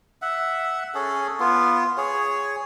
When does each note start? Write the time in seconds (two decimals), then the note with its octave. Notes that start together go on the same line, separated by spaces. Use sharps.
0.22 E5 F#5
0.95 C#4 G#4 A4
1.40 B3 F4
1.97 G#4 C#5